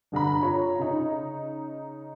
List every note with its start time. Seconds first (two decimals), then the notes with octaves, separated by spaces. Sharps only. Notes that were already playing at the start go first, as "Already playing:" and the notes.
0.12 G1 D3 A#5 B5
0.42 F4 C#5 A#5
0.79 C#3 D#4